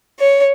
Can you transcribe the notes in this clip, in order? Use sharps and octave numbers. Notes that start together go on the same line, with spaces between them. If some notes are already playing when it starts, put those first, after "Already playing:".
C#5